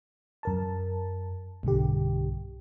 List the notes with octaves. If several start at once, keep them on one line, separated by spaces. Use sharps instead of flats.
F#2 A#4 A5
B1 G2 D3 G4